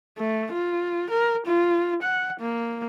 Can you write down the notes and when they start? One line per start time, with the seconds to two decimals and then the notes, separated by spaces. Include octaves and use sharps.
0.18 A3
0.52 F4
1.10 A#4
1.46 F4
2.02 F#5
2.40 A#3